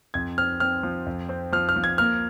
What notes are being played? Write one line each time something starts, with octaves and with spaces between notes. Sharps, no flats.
F2 G#6
C4 F6
C4 F6
F3
F2
C4
F3 F6
F6
F3
G#6
A#3 F6